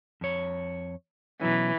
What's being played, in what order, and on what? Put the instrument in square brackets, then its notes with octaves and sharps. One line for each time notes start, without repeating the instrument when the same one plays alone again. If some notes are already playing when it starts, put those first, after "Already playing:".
[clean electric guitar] F2 C#5
[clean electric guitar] B2 F#3 C#4 [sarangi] E3